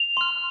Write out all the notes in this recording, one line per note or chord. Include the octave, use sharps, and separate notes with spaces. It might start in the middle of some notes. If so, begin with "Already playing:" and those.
Already playing: F7
C6 F6